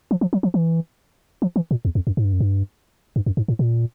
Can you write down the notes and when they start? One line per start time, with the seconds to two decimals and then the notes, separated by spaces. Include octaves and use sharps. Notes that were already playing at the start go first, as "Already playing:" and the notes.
0.11 F3
0.21 F3
0.33 F#3
0.43 F3
0.54 E3
1.42 F3
1.56 E3
1.71 A#2
1.85 E2
1.95 F2
2.07 F#2
2.17 G#2
2.25 G2
2.33 F#2
2.40 G2
3.16 G2
3.26 F#2
3.37 G#2
3.48 A2
3.59 A#2